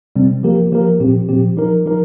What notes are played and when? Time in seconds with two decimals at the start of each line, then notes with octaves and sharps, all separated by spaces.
0.16 C3 G3 C4
0.43 F3 A#3 G4 A#4
0.72 F3 A#3 G4 A#4
1.00 A#2 F3 C4 G4
1.29 A#2 F3 C4 G4
1.57 F3 D#4 A#4
1.86 F3 D#4 A#4